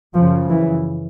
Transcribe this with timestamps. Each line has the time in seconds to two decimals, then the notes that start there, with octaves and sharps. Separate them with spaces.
0.14 F#2 C#3 F3
0.50 E3